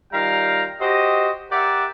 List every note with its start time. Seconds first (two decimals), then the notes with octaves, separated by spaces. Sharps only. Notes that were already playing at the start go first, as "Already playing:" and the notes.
0.12 D#3 G3 F4 F5 G5 A#5
0.80 F#4 G4 C5 D#5
1.51 G4 A#4 D5 E5 F#5